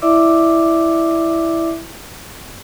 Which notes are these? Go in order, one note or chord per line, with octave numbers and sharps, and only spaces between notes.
E4 D5 E5 D6 E6